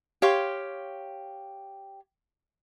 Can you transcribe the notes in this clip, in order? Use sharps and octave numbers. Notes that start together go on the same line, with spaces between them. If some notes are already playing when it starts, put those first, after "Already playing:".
G4 C#5 F5 C6